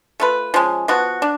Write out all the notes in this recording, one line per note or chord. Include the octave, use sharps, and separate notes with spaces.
A3 F4 B4
F3 G#3 C#4
F3 B3 F#4
D4